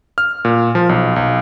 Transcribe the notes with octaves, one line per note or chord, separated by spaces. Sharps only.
F6
A#2
F3
B1
B1